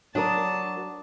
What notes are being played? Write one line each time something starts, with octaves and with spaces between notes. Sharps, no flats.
F#3 D4 A#4 A5 D#6